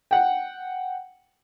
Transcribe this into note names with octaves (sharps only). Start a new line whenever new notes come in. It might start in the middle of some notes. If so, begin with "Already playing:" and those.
F#5 G5